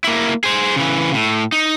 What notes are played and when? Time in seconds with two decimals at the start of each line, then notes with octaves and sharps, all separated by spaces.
0.04 A#3 E4
0.44 G#4 C5
0.76 C#3 E3
1.13 A2
1.52 D#4